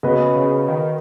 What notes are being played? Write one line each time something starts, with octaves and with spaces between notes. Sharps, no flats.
C#3 B3 F#4 B4 D#5
C#3
D#3